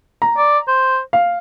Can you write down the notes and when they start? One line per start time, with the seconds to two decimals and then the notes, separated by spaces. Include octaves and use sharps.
0.22 A#5
0.37 D5
0.68 C5
1.13 F5